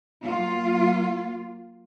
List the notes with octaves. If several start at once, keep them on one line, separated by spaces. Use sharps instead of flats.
F#3 A#3 F4